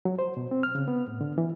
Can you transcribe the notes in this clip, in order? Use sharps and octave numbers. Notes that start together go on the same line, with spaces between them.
F#3
C5
B2
C4
F6
C#3
B3
A2
D3
E3